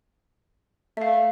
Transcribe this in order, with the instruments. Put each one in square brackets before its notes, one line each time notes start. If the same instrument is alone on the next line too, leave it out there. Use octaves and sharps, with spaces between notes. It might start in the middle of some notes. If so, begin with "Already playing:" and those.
[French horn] A3 [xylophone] E5 F5